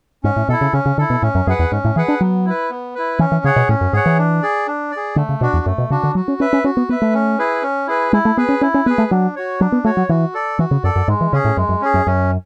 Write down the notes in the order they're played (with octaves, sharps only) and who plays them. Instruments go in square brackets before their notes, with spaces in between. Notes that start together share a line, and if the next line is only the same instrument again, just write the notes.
[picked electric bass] G#2 [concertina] C#4
[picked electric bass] A2
[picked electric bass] B2 [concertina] E4 A4
[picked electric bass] C#3
[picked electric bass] C#3 [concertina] C#4
[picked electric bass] C#3
[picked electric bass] D3 [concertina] E4 A4
[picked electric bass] B2
[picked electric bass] A2 [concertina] C#4
[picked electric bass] F#2
[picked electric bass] F#2 [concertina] G#4 B4 F#5
[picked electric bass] E2
[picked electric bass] G#2 [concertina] C#4
[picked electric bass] A2
[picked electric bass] E3 [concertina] G#4 B4 F#5
[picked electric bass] D4
[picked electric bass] F#3 [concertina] B3
[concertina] E4 B4
B3
E4 B4
[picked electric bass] E3 [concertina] C#4
[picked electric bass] E3
[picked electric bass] C#3 [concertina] G#4 C#5 F#5
[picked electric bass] B2
[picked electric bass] A2 [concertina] C#4
[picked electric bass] F#2
[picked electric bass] G#2 [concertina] G#4 C#5 F#5
[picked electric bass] E3
[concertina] D4
G#4 D5
D4
G#4 D5
[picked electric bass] D3 [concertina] A3
[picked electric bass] C#3
[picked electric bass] B2 [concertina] D4 F#4
[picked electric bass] E2
[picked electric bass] F#2 [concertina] A3
[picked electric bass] B2
[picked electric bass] C#3 [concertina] D4 F#4
[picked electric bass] D3
[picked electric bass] F#3 [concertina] F#4
[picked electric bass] C#4
[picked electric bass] C#4 [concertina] B4 E5
[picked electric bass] C#4
[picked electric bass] C#4 [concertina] F#4
[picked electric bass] B3
[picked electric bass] B3 [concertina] B4 E5
[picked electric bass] A3
[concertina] C#4
E4 G#4 B4
C#4
E4 G#4 B4
[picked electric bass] G#3 [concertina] E4
[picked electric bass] A3
[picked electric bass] B3 [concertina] G#4 B4
[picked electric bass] C#4
[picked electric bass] C#4 [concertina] E4
[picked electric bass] C#4
[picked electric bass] B3 [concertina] B4
[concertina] G#4
[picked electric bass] A3
[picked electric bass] F#3 [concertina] D4
[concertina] F#4 C#5
[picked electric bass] F#3 [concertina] D4
[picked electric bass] B3
[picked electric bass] A3 [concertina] F#4 C#5
[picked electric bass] F#3
[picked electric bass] E3 [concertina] F#4
[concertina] A4 D5
[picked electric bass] E3 [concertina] F#4
[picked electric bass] C#3
[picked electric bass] F#2 [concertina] A4 D5
[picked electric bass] F#2
[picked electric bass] G#2 [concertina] G#3
[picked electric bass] E3
[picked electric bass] C#3 [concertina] C#4 G#4
[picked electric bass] A2
[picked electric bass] F#2 [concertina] G#3
[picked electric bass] F#2
[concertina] C#4 G#4
[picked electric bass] F#2
[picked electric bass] F#2 [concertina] C#4